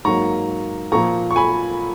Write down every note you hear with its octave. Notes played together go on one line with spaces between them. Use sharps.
G#2 F#3 A#3 A#5 C#6
A#2 F3 A#3 A#5 C#6
C#6
G#5 B5